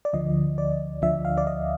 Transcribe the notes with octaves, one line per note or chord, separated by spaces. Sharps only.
D5
D2 D3 F3 D#5
D5
D2 D3 F3 E5
F5
D5
D#5